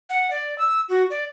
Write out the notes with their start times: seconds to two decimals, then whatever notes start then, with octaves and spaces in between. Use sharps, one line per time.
0.09 F#5
0.31 D5
0.58 E6
0.88 F#4
1.10 D5